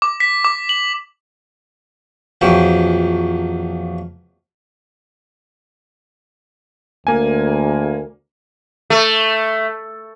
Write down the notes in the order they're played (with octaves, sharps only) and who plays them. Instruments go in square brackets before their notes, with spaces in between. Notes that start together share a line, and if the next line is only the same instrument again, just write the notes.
[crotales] D6
B6
D6
F#7
[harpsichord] A#1 F2 E3 F#3 G5
[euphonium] D2 [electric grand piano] A#3 G#5
[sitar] A3